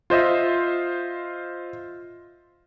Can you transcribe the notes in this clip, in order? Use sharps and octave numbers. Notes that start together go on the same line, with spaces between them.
F4 C5 D#5 E5